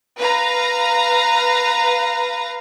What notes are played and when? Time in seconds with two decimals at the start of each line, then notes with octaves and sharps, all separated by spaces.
0.18 B4 F5 A#5